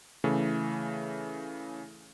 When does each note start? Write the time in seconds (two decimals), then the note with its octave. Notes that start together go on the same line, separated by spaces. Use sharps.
0.24 C#3 E3 A3